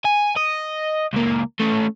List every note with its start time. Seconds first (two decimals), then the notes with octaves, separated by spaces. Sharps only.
0.05 G#5
0.37 D#5
1.13 C#2 A#3
1.60 A3 C#4